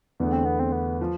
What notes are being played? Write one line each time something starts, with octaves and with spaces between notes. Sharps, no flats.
E2 D3 A3 B3
C4
B3
C4
B3
F3